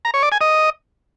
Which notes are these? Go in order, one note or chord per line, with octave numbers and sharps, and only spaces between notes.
A#5
C#5
D5
G#5
D#5